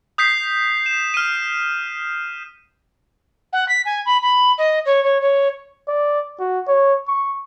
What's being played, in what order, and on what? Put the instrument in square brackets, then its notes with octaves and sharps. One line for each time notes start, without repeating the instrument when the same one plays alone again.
[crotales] D#6 G6 B6 C7
E7
F6 D#7
[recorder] F#5
B6
G#5
B5
B5
D#5
C#5
C#5
C#5
[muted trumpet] D5
F#4
C#5
C#6